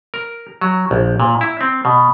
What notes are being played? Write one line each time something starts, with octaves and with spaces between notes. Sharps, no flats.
A#4
F#3
A#1
A#2
E4
C4
B2